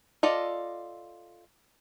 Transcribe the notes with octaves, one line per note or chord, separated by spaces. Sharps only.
F4 A4 D5 D#5